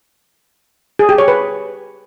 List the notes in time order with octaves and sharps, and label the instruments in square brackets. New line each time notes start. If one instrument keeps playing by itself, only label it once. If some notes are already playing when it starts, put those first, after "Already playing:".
[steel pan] G#4
G4
C#5
B4